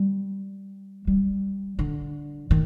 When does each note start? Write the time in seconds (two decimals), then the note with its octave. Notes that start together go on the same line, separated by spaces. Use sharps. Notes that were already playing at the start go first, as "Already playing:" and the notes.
Already playing: G3
1.07 G3
1.79 D3
2.51 D#3